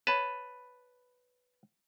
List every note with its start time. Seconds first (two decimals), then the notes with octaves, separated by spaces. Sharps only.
0.07 B4 C#5 A5 B5